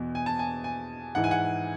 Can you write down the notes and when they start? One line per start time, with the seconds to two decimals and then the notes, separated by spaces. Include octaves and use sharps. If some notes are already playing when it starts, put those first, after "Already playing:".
Already playing: E2 B2
0.15 G#5
0.26 A5
0.39 G#5
0.64 G#5
1.15 G#2 E3 F#5
1.24 G#5
1.31 F#5